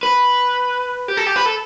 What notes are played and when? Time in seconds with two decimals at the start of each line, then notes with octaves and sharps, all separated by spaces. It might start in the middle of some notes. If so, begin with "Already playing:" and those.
0.03 B4
1.08 G4
1.17 A4
1.27 G4
1.36 B4
1.46 A4